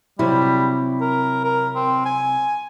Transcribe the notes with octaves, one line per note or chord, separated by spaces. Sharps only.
C3 F#3 G3 E4
A#4
A#4
C4
G#5